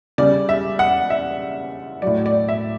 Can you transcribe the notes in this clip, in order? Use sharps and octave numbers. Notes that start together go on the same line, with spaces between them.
C#3 G3 D5
E5
F#5
E5
A2 F#3 D5
D5
E5